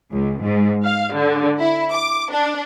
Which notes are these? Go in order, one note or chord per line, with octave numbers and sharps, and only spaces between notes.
C#2
G#2
F5
D3
E4
D6
D4